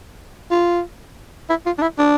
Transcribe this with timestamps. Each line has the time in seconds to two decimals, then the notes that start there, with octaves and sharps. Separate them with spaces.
0.51 F4
1.50 E4
1.66 F4
1.79 D4
1.82 E4
1.99 D4